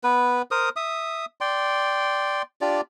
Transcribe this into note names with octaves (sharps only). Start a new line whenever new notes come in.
B3 B4
A#4 C5 D#6
E5 D#6
D5 G5 C6
D4 F4 G4 D5